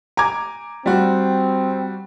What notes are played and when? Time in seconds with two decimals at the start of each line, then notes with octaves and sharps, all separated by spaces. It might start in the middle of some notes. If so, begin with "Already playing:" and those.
0.17 G#5 A#5 D6 G#6
0.86 G3 C4 F#4